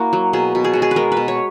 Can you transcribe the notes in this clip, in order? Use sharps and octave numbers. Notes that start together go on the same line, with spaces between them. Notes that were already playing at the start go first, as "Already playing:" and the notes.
Already playing: A#3 E4 F#4
F#3
B2 G#4
B2
G#4
G#3 F#4
G#4
B4
G#3 A#4
B4
B2
C#5